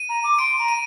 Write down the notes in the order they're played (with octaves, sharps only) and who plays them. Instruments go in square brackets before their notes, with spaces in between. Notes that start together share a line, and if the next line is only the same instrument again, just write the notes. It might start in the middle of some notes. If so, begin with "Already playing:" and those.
Already playing: [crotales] D#7
[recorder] A#5
D6
[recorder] C6 [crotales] D7
[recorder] A#5
[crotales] D#7